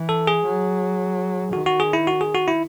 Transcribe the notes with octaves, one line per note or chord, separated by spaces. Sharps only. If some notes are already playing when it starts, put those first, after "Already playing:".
Already playing: E3
A4
G#4
F#3
D#3 F#4
F#4
G#4
E4
F#4
G#4
F#4
E4